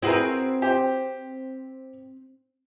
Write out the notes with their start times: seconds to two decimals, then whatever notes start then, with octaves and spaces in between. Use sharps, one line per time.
0.02 C4 E4 F#4 G#4 A#4 B4
0.62 G4 C5